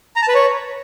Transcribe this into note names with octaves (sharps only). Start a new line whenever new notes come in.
A#5
A5
B4
C#5